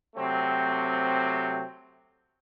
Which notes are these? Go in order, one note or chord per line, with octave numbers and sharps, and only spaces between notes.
C3 F#3 A3 C4